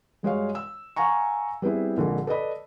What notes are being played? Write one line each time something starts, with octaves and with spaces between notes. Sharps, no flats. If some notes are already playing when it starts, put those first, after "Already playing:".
G2 G#3 F#4 C#5 F5
E6
F5 F#5 G#5 A#5 C#6
G3 B3 C4 E4 G#4
A#1 F2 D3 G#3 A#3
A4 B4 D5 D#5 B5